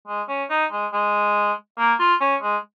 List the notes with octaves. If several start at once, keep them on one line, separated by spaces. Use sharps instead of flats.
G#3
C#4
D#4
G#3
G#3
A#3
F4
C#4
G#3